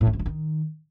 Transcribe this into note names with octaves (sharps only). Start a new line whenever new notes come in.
A2
D#3
G2
F3
D#3